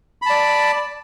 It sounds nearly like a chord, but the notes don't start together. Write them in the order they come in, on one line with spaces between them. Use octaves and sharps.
B5 A5 D5